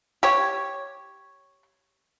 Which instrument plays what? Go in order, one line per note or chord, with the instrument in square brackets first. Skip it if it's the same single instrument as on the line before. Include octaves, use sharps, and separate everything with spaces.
[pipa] G4 C#5